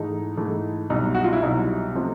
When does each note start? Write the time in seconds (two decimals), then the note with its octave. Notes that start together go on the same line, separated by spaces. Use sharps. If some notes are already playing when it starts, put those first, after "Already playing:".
Already playing: G#2 E3 A3 D#4
0.37 G#2 E3 A3
0.90 C2 B2 F#3 D#4
1.15 F#4
1.24 F4
1.33 E4
1.42 C2 B2 F#3 D#4
1.94 C3 F3 A3 C4